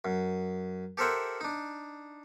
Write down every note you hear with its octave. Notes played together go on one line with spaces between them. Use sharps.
F#2
G4 A4 A#4 C5 E5 F#5
D4 D#4